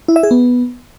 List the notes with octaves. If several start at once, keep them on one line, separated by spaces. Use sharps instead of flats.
E4
E5
G#4
B3